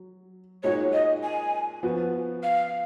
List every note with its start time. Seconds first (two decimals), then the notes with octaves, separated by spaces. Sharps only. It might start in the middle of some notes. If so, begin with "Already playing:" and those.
Already playing: F#3
0.63 A#2 G#3 D#4 F#4 C#5
0.93 D#5
1.23 G#5
1.83 F3 B3 F#4
2.43 F5